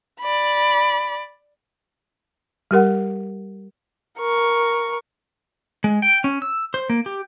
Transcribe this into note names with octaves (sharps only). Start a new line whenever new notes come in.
D5 B5
G3 G4 A#4 F#5
A#4 C#6
G#3
G5
C#4
E6
C5
A#3
G4